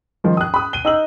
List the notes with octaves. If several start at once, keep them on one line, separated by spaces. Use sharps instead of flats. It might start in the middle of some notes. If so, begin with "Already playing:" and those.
D#3 F3
D#6 F#6
B5 D#6
D#7 G7
D#4 E6 F#7